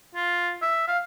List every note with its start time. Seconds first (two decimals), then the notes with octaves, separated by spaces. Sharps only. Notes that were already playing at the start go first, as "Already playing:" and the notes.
0.15 F4
0.62 E5
0.88 F5